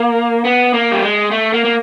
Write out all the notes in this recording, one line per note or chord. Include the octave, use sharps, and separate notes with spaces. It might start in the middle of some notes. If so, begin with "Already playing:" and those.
Already playing: A#3
B3
A#3
G3
G#3
A3
A#3
A#3